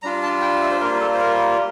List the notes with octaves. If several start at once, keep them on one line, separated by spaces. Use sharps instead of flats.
G3 D4 F4 A#5
A5
G5
E5
C5
G3 A#3 F4 A#4
A4
C5
A#4